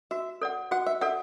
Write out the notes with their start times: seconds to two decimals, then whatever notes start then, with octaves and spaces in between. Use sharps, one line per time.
0.11 F#4 E5
0.42 A4 D5 F#5
0.71 F#4 F#5
0.87 E5
1.01 A4 D5 E5 F#5